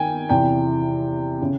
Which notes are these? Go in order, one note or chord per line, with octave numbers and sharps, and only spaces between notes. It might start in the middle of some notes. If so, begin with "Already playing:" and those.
Already playing: D#3 G5 G#5
E2 C3 E3 G5
C#3